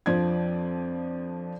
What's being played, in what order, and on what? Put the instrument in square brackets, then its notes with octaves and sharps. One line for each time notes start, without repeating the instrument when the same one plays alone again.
[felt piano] F2 F3 C4 D4 D5 G#6